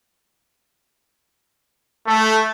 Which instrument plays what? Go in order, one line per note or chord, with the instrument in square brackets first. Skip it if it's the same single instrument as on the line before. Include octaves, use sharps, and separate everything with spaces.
[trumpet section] A3